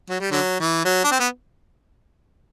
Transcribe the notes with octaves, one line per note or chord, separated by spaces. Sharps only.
F#3
G3
D3 F#3
E3
F#3
D4
C4
B3